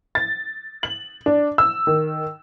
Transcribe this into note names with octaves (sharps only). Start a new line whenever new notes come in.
A6
F#7
D4
E6
D#3